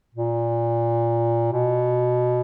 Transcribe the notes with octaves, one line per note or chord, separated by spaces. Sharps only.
A#2
B2